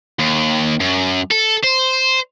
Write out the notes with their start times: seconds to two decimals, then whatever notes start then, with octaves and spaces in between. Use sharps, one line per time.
0.19 D#2
0.81 F#2
1.31 A4
1.64 C5